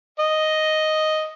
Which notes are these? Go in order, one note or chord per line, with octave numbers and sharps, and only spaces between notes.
D#5